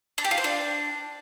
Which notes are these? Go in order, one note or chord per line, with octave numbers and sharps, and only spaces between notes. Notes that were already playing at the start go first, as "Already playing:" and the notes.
D4
G4
F4
C5
D4